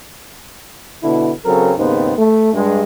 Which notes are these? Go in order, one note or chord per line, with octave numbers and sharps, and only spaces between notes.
B2 D3 B3 E4
C#3 F#3 C4 A4 A#4
D#2 G#2 C#3 B3 C4
A3
G2 G#3